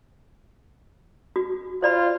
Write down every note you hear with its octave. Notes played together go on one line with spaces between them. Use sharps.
F#4
F4 C5 D5 B5